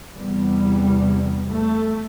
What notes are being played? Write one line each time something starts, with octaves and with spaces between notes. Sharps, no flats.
E2 C3 G3
A3